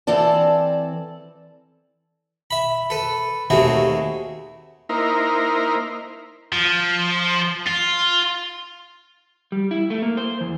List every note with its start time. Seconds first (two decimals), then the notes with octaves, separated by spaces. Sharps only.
0.07 E3 C4 A4 D5 A5
2.51 E5 B5
2.90 A4 B4
3.50 D#2 C3 A3 E4 F#4 G#4
4.89 A#3 D#4 E4 A#4 C5
6.53 F3
7.66 F4
9.52 G3
9.71 E4
9.90 A3
10.02 A#3
10.17 C5
10.41 E2